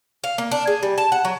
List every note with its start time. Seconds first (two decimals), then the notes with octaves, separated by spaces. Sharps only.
0.24 F5
0.38 A#3
0.51 D4
0.67 G#4
0.83 G3
0.98 A5
1.12 F#5
1.25 F#3